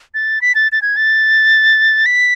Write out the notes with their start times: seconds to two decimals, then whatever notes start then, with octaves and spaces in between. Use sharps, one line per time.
0.14 A6
0.41 B6
0.55 A6
0.72 A6
0.82 G#6
0.96 A6
2.06 B6